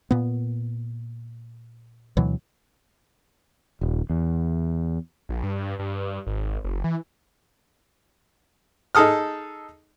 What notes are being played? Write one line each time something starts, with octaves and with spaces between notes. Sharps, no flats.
A#2 B3
D2 B2 E3 F#3
D#1
E2
A#1
G2
G2
G#1
F#1
E3
D#4 G#4 A4 D#6 F6